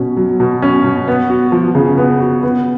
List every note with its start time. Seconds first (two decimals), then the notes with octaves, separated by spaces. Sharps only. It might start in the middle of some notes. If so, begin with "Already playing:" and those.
Already playing: B2 C#4
0.17 F#3
0.40 B2
0.62 C#4
0.84 B2
1.08 B3
1.30 F#4
1.52 F3
1.75 C#3
1.98 B3
2.20 F#4
2.43 B3